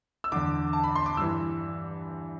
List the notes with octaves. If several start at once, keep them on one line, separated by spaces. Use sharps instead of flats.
E6
E2 D3 D6
A5
B5
C6
D6
G2 E3 E6